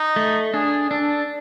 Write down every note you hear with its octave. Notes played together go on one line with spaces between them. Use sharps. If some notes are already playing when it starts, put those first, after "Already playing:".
Already playing: D#4
A3
D4 G#4
D4 A4